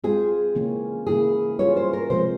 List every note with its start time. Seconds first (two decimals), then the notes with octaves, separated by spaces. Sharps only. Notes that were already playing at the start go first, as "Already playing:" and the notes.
0.04 G#3 C4 F4 G#4 C5
0.55 C#3 E3 A#3 C#4
1.07 C#3 E3 A#3 E4 G#4
1.59 G3 C#4 F4 C#5
1.77 C5
1.93 A#4
2.10 C3 F3 G#3 C5